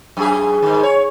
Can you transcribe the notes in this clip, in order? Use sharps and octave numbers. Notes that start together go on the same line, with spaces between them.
F#2 G#4
G#2 D#3
C#5